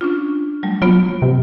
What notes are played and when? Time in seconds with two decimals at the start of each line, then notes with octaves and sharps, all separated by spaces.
0.01 C#4 D4 F4
0.63 F#3 G3 A3
0.82 F#3 A#3 B3 F4
1.22 C3